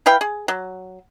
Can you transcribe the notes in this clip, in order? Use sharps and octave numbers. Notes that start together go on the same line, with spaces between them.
E4 B4 F5 G5
G#4
F#3